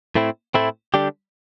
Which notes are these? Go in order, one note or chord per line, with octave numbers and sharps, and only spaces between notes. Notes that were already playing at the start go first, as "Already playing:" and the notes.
A2 A3 C4 E4
A2 A3 C4 E4
D3 G3 D4 G4